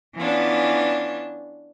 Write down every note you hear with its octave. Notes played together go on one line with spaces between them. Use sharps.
E3 B3 C#4 D4 F4